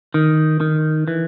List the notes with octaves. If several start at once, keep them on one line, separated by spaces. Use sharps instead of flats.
D#3
D#3
E3